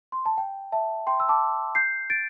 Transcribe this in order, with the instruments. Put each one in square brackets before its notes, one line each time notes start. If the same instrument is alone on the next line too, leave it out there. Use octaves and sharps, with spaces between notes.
[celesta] C6
A5
G5
E5 A5
G5 C6
E6
A5 D6
G6 C7
A6 D7